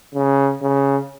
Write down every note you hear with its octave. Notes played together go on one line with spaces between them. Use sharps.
C#3
C#3